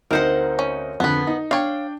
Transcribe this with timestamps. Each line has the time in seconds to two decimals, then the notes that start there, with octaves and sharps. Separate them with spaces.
0.11 D2 C4 D#4 A#4 C5 F#5
0.59 C#4
1.00 F2 D3 B3 B4
1.27 D#4
1.51 D4 C#5 F5 G5